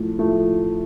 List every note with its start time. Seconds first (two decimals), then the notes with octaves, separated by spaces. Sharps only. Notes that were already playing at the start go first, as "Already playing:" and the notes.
Already playing: A2 F3 A3
0.18 A2 F3 A3